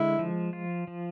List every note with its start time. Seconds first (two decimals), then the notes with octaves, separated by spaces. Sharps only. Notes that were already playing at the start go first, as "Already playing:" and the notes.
Already playing: D3 G#3 E4
0.19 F3
0.53 F4
0.87 F3